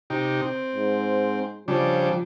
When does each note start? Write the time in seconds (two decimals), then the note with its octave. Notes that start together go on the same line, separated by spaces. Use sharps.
0.10 C3 D#4 G4
0.42 C4
0.75 G#2
1.68 C#3 F3 G3 D4